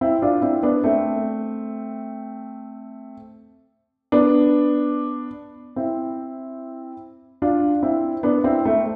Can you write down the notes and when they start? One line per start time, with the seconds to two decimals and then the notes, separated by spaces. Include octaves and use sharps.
0.01 C4 E4
0.22 D4 F4
0.42 C4 E4
0.63 B3 D4
0.84 A3 C4
4.12 B3 D4
5.76 C4 E4
7.42 D4 F4
7.83 C4 E4
8.23 B3 D4
8.44 C4 E4
8.65 A3 C4